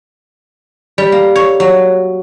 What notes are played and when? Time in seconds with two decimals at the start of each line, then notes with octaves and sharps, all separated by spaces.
0.98 G3
1.12 A#3
1.36 C#5
1.60 F#3